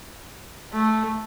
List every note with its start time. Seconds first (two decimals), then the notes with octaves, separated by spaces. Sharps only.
0.73 A3